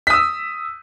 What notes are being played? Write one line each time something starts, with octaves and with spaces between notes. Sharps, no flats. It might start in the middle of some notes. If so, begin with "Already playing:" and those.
D#6 E6 B6